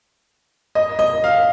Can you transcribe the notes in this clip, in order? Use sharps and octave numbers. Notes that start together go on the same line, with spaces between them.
D#5
D#5
F5